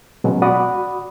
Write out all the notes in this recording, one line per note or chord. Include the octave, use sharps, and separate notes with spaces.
B2 F#3 G#3 C#4
F#4 D5 F#5 B5 D#6